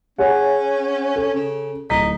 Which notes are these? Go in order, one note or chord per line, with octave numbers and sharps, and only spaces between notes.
C#4 G#4 C#5 F#5
A4
C#3
D1 D#4 B6